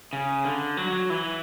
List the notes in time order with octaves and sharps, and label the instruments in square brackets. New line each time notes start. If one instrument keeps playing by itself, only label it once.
[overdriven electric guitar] C#3
D3
F#3
E3